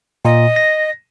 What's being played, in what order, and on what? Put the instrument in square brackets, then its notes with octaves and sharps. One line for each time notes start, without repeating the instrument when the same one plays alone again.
[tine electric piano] A#2 [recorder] D#5
[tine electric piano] A#6